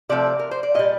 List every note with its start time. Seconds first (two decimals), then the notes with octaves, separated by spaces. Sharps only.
0.09 C3 F3 A3 D5
0.39 A#4
0.51 C5
0.63 D5
0.74 A#2 G3 D#5